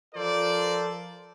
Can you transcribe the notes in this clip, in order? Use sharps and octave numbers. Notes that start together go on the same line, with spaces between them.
F3 F4 A4 A#4 C5 D5